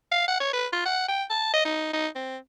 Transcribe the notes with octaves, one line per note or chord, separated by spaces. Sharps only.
F5
F#5
C#5
B4
F4
F#5
G5
A5
D#5
D#4
D#4
C4